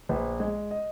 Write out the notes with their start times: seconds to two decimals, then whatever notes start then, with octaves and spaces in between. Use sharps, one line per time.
0.09 A#1 B4
0.40 G#3
0.71 D#5